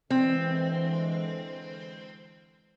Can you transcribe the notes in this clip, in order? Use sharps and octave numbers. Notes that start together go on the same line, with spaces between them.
D3 E3 G#3 C4